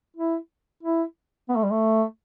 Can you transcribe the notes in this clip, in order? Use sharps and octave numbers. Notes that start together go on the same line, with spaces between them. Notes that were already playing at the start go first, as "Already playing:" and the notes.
E4
E4
B3
A3
G3
A3